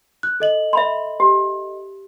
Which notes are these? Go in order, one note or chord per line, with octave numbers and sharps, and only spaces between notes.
F#6
A4 D#5 F#7
E5 B5 C6
G4